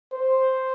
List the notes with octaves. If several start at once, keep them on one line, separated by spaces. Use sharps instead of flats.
C5